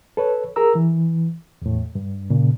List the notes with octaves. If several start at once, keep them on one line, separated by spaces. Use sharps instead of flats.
A4 B4 C#5
G#4 A#4 A#5 E6
E3
E2 A2
G2
A#2 C#3